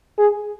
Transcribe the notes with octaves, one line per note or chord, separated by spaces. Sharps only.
G#4